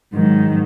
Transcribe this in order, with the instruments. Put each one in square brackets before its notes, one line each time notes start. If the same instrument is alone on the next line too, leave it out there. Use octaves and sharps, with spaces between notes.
[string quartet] G#2 D#3 F#3